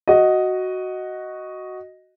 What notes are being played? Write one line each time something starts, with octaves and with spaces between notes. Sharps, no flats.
F#4 D#5